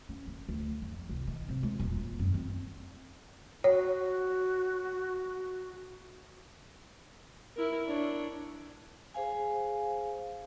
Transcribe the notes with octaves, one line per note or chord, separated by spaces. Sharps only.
C#4
F#1
D2
F2
C2
D#3
C3
G#3
D#1
F4
F#2
C4
F#4 C#5
E4 A#4
D4 C#5
G#4 C5 F5 G#5